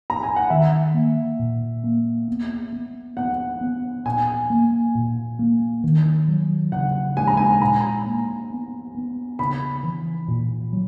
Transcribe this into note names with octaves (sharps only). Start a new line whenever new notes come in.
A#5
G#5
F#5
D#3 E5
A#3
A#2
A#3
B3
B3
B3 F#5
B3
A#2 G#5
A#3
A#2
A#3
D#3
F#3
C#3 F#5
G#3 G#5
A#5
G#5
A#2 A#5
A#3
B3
B3
C#3 B5
E3
A#2
F#3